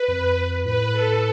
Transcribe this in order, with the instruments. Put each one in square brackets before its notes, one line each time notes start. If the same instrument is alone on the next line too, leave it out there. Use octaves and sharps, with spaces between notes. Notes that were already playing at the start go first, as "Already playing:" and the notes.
Already playing: [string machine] B4
[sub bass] F2
[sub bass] A2 [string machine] B4
[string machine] A4